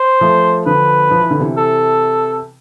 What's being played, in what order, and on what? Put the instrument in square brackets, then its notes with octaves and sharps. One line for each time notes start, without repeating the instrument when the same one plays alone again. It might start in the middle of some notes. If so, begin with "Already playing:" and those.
Already playing: [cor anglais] C5
[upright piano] F3 A3
[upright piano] D3 F3 [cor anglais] B4
[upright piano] F3
E3
D3
C3 E3
[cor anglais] A4